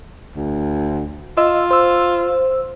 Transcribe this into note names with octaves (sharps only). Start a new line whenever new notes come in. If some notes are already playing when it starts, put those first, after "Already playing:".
D2
F4 D#5 E6
C5 E6